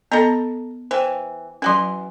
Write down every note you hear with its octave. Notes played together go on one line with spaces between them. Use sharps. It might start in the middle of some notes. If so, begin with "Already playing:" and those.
B3 A4 D#5 A#5 B5
E3 C5 G5
E3 F#3 C#4 F#4 C6